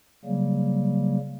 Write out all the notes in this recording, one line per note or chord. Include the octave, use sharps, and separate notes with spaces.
C#3 F#3 G3 A#3